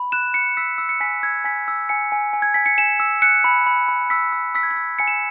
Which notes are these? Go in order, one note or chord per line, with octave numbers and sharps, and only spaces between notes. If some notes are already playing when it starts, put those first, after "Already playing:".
Already playing: B5
F#6 E7
F#6 C#7
E6 B6
E6
C#7
G#5 B6
E6 G#6
G#5 B6
E6
G#5 C#7
G#5
G#5
G#6
G#5 B6
C#7
G#5 E7
E6
F#6 C#7
B5
B5
B5
E6 B6
E6
E6 B6
G#6
B6
E6
G#5 C#7
E7